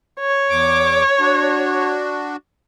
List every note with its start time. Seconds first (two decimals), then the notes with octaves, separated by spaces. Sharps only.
0.20 C#5
0.50 E2 D6
1.20 D4 F#4